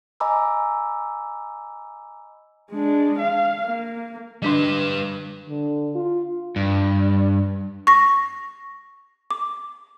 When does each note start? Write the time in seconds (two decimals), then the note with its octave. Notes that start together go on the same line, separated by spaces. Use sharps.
0.20 D#5 G#5 A#5 B5 D6 E6
2.71 G#3 D4
3.19 F5
3.65 A#3
4.42 D3 G3 D4 B4 D#5
5.49 D3
5.95 F4
6.56 G2
7.87 C#6 A#6
9.31 D6